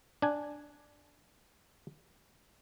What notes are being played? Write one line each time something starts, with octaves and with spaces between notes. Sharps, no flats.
D4 G#5